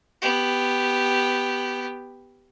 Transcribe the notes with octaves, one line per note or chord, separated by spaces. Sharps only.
B3 G4